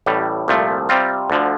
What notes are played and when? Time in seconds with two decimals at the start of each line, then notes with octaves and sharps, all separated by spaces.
0.06 A1 A2 G3
0.48 C2 A#2 F3 A3
0.89 C3 G3 C4 F4
1.30 D2 D3 F3